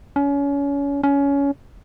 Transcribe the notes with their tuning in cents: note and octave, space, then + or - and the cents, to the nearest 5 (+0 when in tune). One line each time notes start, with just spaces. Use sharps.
C#4 +30
C#4 +20